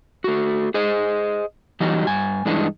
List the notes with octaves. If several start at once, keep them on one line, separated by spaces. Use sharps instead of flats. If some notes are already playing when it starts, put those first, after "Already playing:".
A3 F#4
G#4 C5 D#5
E3 F#3 G3 D#4 G4
G2 G#5
G2 E3 G#3 D4 D#4